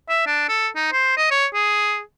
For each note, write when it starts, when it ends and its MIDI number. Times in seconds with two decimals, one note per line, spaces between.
0.09 0.23 76
0.26 0.44 62
0.48 0.68 69
0.76 0.91 63
0.92 1.14 72
1.17 1.28 75
1.31 1.47 73
1.54 2.00 68